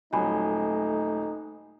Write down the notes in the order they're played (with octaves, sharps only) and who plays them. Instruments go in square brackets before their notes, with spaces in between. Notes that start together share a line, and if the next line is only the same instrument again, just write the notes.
[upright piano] D#1 F#3 [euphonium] A3 [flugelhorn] D#4 [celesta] G#5 B5